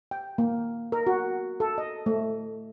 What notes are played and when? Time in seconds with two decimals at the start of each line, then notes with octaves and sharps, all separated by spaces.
0.11 G5
0.38 A#3
0.92 A#4
1.07 F#4
1.60 A4
1.78 D#5
2.06 A3